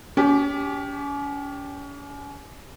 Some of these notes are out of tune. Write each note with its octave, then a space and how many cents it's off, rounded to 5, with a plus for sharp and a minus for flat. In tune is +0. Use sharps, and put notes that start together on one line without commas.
C#4 +35 G4 +0